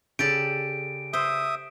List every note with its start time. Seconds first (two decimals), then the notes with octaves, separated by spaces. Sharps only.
0.19 C#3 G4 A4 D5 D7
1.13 C5 E5 D#6